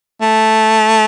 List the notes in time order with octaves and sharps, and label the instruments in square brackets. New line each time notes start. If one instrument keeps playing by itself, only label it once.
[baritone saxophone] A3